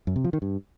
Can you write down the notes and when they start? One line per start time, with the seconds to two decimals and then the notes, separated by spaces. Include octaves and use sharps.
0.07 F#2
0.16 C3
0.24 F3
0.33 D#3
0.42 G2